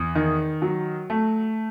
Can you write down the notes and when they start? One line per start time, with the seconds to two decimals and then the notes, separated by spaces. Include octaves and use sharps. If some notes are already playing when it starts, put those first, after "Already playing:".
Already playing: E2
0.15 D#3
0.62 F#3
1.10 A3